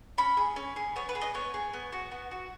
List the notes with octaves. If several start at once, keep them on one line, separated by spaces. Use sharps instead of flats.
C#4 B5
G#4
C#4
G#4
B3 C#5
B4
G#4
D#5
B3 C#5
G#4
B3
F#4
B3
F#4